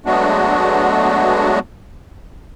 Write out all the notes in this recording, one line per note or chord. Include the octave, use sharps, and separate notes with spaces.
F#3 G#3 A3 B3 D4 F#4